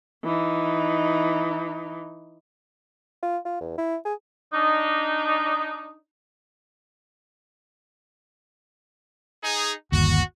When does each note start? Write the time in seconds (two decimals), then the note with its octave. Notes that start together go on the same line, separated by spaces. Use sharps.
0.24 E3 D#4
3.23 F4
3.45 F4
3.60 E2
3.78 E4
4.05 G#4
4.54 D4 D#4
9.43 D#4 G#4
9.92 G1 D#2 F#4